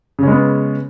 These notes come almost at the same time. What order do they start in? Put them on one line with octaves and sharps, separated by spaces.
C#3 C#4 G#3 B3